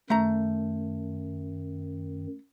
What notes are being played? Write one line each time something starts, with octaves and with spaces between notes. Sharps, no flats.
F#2 D#3 A3 A#5